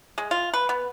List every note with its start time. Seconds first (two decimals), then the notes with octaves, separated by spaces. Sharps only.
0.18 G#3
0.31 F4
0.54 B4
0.69 B3